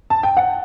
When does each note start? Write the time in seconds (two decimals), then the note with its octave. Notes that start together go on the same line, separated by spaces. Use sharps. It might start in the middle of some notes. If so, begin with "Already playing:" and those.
0.10 A5
0.23 G5
0.37 F#5